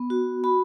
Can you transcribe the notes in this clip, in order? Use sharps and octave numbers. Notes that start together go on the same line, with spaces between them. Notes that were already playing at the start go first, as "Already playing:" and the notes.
Already playing: B3
F#4
F#4 B5